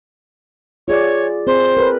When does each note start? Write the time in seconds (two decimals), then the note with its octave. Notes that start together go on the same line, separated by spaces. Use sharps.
0.88 F4 G#4 C#5 D5
1.47 C4 G#4 C5
1.77 A#4 B4